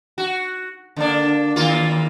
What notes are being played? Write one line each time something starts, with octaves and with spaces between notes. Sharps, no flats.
F#4
D3 A#3 D4
D#2 A#3 F4